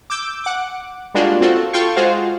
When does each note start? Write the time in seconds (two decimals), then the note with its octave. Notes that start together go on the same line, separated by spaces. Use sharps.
0.10 D6 E6 G6
0.44 F#5 D6
1.15 G3 G#3 A#3 D4 F4 F#4
1.41 C4 F4 F#4 A4
1.73 F4 A4 F5 G5 C6 C#6
1.96 G#3 F4 F#4 G#4 C5 F5